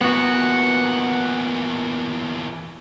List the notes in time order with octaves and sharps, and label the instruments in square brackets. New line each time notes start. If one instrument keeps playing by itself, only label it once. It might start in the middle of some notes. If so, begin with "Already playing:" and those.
[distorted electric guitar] E2 A#2 [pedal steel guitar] B3 F#4 [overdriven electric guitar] F#5